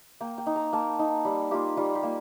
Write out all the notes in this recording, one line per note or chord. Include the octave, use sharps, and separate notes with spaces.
A#3 G5
G5
D#4
A#5
A#3 A5
D#4
G3
A#3 F4 G4
G3 F4
G4
A#3